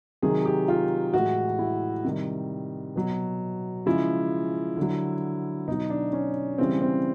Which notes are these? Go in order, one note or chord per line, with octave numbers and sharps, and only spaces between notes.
C3 D#3 F#3 G#4
G4
F4
A2 E3 G#3 F#4
E4
C3 D#3 G3
B2 F#3
C#3 F3 G#3 E4
D3 F#3
B2 F#3 D#4
D4
C#4
C#3 E3 G3 C4
C4